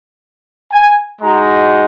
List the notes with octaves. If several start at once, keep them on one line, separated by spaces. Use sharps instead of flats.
G#5
G#3 D#4 F#4 A#5